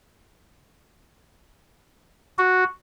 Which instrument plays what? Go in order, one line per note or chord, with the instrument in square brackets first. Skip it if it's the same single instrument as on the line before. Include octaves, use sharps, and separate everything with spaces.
[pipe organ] F#4